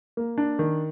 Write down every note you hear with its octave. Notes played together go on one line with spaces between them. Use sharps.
A#3
D4
D#3